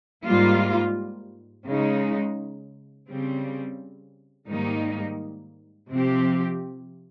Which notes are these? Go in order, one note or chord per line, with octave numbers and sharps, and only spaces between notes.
G#2 G3 A#3 F4
C#3 G#3 D#4
C#3 G3 C4
G#2 D#3 G3 A#3 D#4
C3 F3 C4 G4